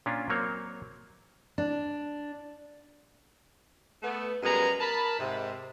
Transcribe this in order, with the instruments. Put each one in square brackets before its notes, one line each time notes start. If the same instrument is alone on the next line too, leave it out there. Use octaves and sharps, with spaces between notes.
[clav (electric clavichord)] A#2 C#4 D4 F4
F#3 A#3 C4 C#5
[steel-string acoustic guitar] D4
[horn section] A3 B3
F#2 G3 G#3 B3 G#4 A#5
A#4 A5 B5
G#2 C3